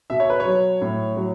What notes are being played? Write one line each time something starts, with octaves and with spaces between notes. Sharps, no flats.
B2 E5
C#5
B4
C#5
F#3
A2
F#3